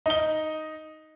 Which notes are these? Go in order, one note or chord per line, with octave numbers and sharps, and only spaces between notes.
D#4 G7